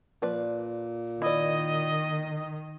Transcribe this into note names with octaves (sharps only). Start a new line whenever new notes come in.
A#2 F3 B4 D5
D#3 E4 D5 D#5